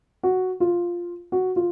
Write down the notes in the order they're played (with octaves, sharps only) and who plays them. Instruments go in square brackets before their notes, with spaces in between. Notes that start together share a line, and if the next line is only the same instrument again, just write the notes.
[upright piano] F#4
F4
F#4
F4